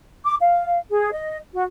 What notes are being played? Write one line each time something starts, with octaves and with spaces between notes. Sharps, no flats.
D6
F5
G#4
D#5
F#4